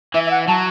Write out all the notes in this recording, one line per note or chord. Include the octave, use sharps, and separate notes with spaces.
E3 E5
E5
F#5
F#3 A5